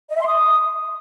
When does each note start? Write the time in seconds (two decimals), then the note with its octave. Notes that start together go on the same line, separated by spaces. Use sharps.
0.10 D#5
0.15 E5
0.21 C6
0.26 D#6